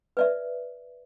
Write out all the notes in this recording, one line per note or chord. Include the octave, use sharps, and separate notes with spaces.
B4 D5 E5